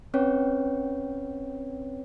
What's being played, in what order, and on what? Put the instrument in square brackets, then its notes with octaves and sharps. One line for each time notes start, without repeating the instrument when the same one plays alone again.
[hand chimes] C4 C#4 B4 C#5 G5